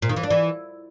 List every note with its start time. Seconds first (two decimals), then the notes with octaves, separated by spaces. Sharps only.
0.02 A#2
0.09 D#3
0.16 E3
0.23 D4
0.30 E3